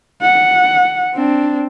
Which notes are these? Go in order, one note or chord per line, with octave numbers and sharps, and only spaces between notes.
F#5
C4 D4